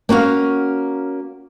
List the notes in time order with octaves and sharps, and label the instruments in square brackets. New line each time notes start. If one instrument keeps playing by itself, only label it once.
[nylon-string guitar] A#3 C#4 F#4 F5